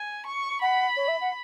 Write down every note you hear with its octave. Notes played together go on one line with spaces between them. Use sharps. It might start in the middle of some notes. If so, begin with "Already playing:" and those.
Already playing: G#5
C#6
F#5 B5
C#5
E5
F#5